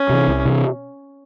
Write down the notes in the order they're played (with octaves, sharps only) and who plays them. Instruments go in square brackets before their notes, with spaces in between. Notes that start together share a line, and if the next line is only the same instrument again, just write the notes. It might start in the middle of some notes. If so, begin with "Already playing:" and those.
Already playing: [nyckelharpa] C#4
[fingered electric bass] C3 E3
C2
C3 E3